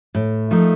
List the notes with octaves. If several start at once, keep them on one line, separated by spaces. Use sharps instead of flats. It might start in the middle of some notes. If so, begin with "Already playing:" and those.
A2
F3 A3 D#4 A#4